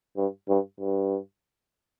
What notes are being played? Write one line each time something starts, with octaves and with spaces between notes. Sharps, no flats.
G2
G2
G2